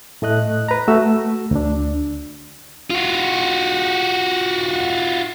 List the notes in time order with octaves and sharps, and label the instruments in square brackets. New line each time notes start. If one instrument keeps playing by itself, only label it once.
[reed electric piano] A2 A3 D#5 F#6
B4 A#5
A3 F#4 E6
D2 D4
[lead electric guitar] F4 F#4